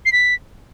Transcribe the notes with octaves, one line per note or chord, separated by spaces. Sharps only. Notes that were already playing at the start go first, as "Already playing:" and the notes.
C7
B6